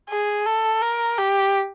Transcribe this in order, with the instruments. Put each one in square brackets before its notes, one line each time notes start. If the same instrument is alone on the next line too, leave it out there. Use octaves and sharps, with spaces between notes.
[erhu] G#4
A4
A#4
G4